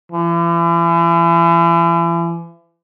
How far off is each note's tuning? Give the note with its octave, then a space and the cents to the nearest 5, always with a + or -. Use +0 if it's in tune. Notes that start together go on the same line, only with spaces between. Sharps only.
E3 +40